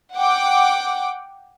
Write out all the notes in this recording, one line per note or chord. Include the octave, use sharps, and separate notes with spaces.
F#5 G5 D6